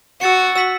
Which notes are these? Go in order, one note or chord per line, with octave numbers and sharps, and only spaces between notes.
F#4 E6 A6 C#7
E6 B6 F#7